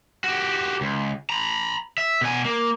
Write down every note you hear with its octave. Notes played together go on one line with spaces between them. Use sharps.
F#4 G4
C#2
A#5 B5
E5
B2 G#5
A#3